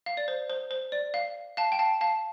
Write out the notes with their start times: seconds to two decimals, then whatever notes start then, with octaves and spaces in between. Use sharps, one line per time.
0.06 F5
0.17 D5
0.28 C5
0.50 C5
0.71 C5
0.92 D5
1.14 F5
1.57 F5 A5
1.72 G5
1.79 F5 A5
2.01 F5 A5